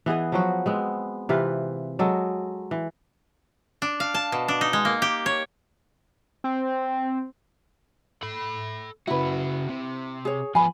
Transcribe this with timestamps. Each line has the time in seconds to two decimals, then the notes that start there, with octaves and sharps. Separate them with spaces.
0.06 E3 B3 G#4 D#5
0.32 F3 F#3 F#4
0.66 G#3 B3 C4
1.29 C3 E3 F4 B4
1.99 F#3 G#3 A4 D#5
2.71 E3
3.82 D4
4.00 F5
4.14 A5
4.32 B2
4.48 D4
4.61 D#4
4.73 G#3
4.85 A#3
5.02 G4
5.26 C#5
6.44 C4
8.23 A4 B5
9.07 C#3 E4 F#4 B4
9.69 C3
10.25 G#4 C#5
10.55 F3 B3 G#5 B5